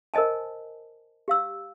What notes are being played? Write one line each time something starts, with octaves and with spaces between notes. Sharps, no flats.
A#4 C5 D#5 G#5 A5
G4 F5 E6